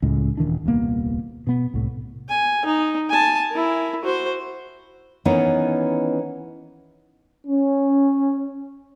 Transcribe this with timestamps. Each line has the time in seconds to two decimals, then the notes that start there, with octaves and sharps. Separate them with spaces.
0.02 C#2 A2 G#3
0.37 D#1 D#3 E3 D4
0.65 D#1 C2 A#3 B3
1.47 B2 B3
1.74 C2 A2
2.29 G#5
2.65 D#4
3.10 G#5 A5
3.51 E4 A#4
4.05 F#4 C5
5.25 D#3 E3 B3 C#4 D#4
7.47 C#4